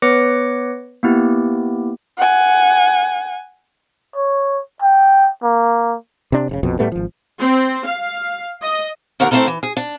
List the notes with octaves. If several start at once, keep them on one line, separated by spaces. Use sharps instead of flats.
B3 B4 C#5 D6 A#6 C#7
A#3 B3 E4 G4
F#5 G#5
C#5
G5
A#3
C3 D4
F1 G#2 C#3
A#1 F2 B2
A2 G3 A3 B3
G#1 F3
C4
F5
D#5
D#2 D3 A#4 C#5 F#5
A3 C4 D#4 E4 A4 A#4
E3
G#4
D4